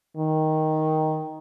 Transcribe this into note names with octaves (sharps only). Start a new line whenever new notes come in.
D#3